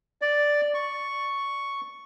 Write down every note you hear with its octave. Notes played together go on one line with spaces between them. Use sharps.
D5
C#6